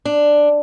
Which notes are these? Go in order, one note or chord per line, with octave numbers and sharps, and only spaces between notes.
D4